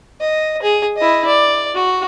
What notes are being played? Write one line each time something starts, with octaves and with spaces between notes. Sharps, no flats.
D#5
G#4
E4 D#5
D5
F#4